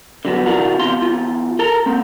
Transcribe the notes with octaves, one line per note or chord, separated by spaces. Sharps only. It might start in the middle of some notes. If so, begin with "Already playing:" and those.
D3 F#3 B3
C3 E3 D4 F4 F#4 A#4
E2 C3 F5 C6
E2 F4
A4 A#4 A#5
A#3 C4